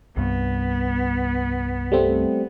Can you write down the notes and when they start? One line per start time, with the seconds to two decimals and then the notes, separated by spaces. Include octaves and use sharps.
0.17 C2 G2 B3
1.92 G3 A3 C4